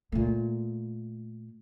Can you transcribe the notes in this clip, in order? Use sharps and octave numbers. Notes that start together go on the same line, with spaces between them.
A#2 A3